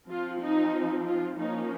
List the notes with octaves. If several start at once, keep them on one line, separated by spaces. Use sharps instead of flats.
F3 C4 F4
D#4
F4
F3 A#3 C#4 D#4